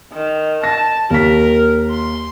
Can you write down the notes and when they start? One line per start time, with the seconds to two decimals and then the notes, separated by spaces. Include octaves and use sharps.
0.13 D#3
0.64 A5 A#6
1.10 D#2 A#4 B6
1.90 C6